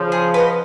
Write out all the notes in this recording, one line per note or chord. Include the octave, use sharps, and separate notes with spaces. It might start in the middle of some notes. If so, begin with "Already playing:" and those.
Already playing: C#3 F3
G#4
B4 D#5 F#5